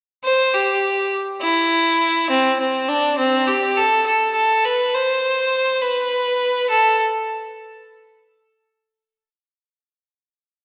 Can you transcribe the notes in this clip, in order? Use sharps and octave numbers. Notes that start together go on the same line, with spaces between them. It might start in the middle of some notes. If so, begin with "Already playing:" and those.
C5
G4
E4
C4
C4
D4
C4
G4
A4
A4
A4
B4
C5
B4
A4